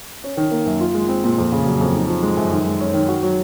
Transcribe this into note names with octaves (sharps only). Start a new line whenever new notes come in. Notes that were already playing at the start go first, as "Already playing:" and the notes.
C#4
D#3
A#3
F#2
F4
G#3
C4
A#2
F2
C#3
F#3
F2
D#4
F3
G#3
F#2
D#3
G#3
C#4
D#3
F#4
F#3